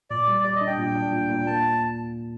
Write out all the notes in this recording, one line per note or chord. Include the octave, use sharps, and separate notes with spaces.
A#2 D5
G3
G3 D5
D#5
D4
G5
A#2
D4
A#2
A#2
A#3 A5